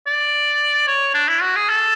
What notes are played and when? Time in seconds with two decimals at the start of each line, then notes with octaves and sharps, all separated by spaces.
0.07 D5
0.87 C#5
1.14 D4
1.28 E4
1.42 F#4
1.56 G#4
1.69 A4